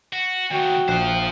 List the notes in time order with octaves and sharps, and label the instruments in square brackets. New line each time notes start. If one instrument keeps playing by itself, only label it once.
[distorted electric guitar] F#4
[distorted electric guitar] D#2 C#3 [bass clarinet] F#4 [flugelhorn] G5
[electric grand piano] A#1 F#6 [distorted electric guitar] F4 C5